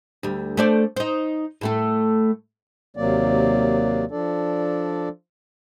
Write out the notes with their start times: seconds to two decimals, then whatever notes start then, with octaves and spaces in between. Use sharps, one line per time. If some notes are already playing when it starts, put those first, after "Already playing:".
0.23 D2 G3
0.57 A3 C5 D5
0.96 D#4 C5
1.61 A2 A3 A4
2.97 D#2 C3 F#3 A#3 D5
4.11 F3 D4 A4 D5